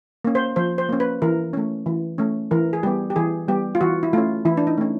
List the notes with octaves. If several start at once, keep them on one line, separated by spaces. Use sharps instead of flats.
A#3 C#4
C5
F3 C5
C5
A#3 C#4
B4
E3 A#4
A3 C#4
E3
A3 C#4
E3 A#4
G#4
G3 B3 G4
G4
E3 G#4
G3 B3 G4
F4
E3 F#4
E4
A3 C#4 F4
E3 E4
D4
D#4
A3 C#4